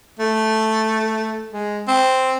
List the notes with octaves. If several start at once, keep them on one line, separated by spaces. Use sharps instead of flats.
A3
G#3
C4